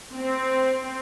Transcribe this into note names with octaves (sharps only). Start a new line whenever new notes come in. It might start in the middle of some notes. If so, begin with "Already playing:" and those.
C4